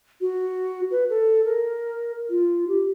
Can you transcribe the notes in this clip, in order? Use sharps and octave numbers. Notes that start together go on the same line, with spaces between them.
F#4
B4
A4
A#4
F4
G4